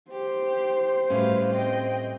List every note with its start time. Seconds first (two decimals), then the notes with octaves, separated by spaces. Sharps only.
0.11 G4 C5
1.10 A2 G3 C#4 F#4 B4 F5
1.49 C4 D#5 G5